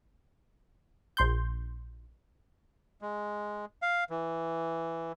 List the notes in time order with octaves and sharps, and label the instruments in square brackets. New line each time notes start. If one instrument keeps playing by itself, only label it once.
[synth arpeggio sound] A#1 C6 G6
[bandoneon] G#3
F5
E3